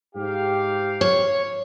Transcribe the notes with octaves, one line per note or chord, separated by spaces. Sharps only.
G#2 G4 F5
C#5